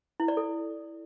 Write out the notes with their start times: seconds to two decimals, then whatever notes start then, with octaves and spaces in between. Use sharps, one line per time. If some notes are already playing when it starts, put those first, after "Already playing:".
0.20 E4
0.28 D5
0.37 A4